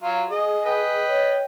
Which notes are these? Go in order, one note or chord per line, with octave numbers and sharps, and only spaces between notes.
F#3 F4 F5
G#4 D#5
B4 D#5 G5
C#5